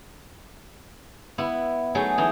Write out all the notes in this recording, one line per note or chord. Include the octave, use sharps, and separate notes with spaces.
B3 E4
F#3 A3 D#4 G#4
E3 D#4